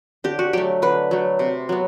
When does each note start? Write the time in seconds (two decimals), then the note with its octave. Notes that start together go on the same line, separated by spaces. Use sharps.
0.24 D3 G4
0.39 F#4
0.53 F#3 A3 G4
0.82 D3 B4
1.11 F#3 A3
1.39 C3
1.69 F#3 B3